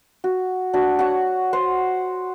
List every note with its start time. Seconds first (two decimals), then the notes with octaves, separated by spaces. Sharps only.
0.24 F#4
0.73 D4 F#4
0.99 F#4 C#5 F#5
1.53 C5 F#5